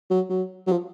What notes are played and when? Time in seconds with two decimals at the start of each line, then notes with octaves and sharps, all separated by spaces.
0.10 F#3
0.30 F#3
0.67 F#3
0.71 F3